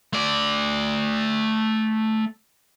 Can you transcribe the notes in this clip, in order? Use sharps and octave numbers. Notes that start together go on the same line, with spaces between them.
A3 D5